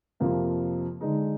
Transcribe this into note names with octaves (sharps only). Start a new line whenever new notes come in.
F2 C3 F3 A#3 F4
D3 G#3 D#4